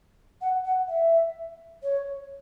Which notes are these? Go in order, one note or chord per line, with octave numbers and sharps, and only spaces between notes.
F#5
F#5
E5
C#5